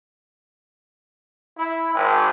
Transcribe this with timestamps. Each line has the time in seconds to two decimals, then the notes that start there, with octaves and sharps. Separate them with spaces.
1.57 E4
1.94 G#1